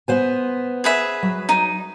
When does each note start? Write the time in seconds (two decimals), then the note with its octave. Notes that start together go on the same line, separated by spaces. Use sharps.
0.08 B3 C5 G#5
0.84 G#4 B4 E5
1.23 F#3
1.49 D#4